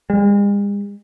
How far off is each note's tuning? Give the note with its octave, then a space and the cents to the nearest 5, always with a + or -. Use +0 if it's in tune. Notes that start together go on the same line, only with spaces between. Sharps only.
G#3 -45